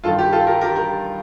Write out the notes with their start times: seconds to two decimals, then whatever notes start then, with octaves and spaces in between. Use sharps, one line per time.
0.04 G2 D#3 F4 A4
0.19 G4
0.32 F4 A4
0.47 G4 A#4
0.61 G4 A#4
0.76 G4 A#4